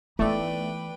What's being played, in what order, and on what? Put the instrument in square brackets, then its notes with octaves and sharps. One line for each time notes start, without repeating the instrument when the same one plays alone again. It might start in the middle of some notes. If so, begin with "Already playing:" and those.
[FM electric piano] E3 D5 [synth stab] A3 [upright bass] B3 D#4 [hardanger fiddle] B4 G5